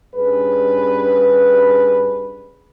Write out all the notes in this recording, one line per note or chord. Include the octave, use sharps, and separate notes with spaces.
G2 C#4 G#4 B4